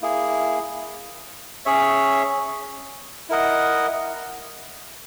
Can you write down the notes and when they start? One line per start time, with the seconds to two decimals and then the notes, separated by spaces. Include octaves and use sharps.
0.02 A#3 E4 G#4
1.65 C#4 G#4 C#5 E5
3.29 E4 A#4 D#5 F#5